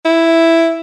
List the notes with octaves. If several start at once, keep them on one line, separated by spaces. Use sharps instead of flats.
E4